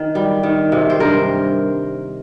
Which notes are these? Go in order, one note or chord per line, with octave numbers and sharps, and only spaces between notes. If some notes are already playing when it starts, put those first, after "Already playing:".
Already playing: D#3
G3
D#3
C3
C5
G2 A#4